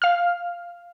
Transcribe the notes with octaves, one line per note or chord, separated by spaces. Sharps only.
F5 F6